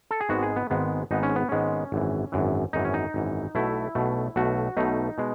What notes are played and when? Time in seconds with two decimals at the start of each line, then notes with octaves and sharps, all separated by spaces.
0.11 A4
0.21 G#4
0.29 G#1 G#2 D#3 G#3 B3 F#4
0.43 G#4
0.56 B3
0.70 G#1 G#2 D#3 G#3 B3
1.11 G#1 G#2 D#3 G#3 B3 D#4
1.23 C#4
1.36 B3
1.49 G#1 G#2 D#3 G#3 B3 C#4
1.92 G#1 F#2 E3
2.32 G#1 F#2 E3
2.73 G#1 F#2 E3 D#4
2.84 C#4
2.94 D#4
3.14 G#1 F#2 E3
3.55 B1 B2 A3 E4
3.95 B1 B2 A3
4.36 B1 B2 A3 F#4
4.77 B1 B2 A3 D#4
5.18 B2 G#3 B3